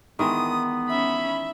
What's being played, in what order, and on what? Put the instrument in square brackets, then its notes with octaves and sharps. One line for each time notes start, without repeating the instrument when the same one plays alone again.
[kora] D#3 E3 G#3 [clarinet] B3 [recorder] D#6
[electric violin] C#4 B5 [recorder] E5